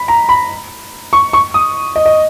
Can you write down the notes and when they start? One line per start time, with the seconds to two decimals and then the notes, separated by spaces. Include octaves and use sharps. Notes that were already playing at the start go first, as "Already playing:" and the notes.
Already playing: B5
0.08 A#5
0.29 B5
1.13 C#6
1.33 C#6
1.54 D#6
1.96 D#5
2.06 D#5